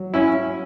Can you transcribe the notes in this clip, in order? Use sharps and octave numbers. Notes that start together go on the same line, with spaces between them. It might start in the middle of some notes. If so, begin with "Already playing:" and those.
Already playing: F#3
C#4 E4